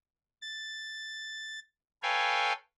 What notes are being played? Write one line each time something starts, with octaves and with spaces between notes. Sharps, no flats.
A6
A4 B4 C#5 F5 G5 G#5